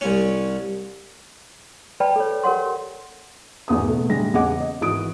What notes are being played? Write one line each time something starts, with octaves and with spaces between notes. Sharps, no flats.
C2 C#4
B4 D5 G5 A5 B5
A4 C#5
G4 A#4 C#5 F#5 C6
G#1 E2 B3 D#6
B2 A3 B3
A2 D3 G3 G#3 A#6
E2 C#3 G#4 D#5 F#5 D6
D#5
G#1 E3 F#4 D#6 D7